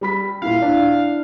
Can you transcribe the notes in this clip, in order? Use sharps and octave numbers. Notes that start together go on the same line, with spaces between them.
G3 B5 B6
A#2 E4 F5
D4 E4